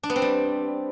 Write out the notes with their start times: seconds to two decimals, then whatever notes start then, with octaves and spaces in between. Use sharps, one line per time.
0.03 D4
0.10 B3
0.16 C4
0.22 G3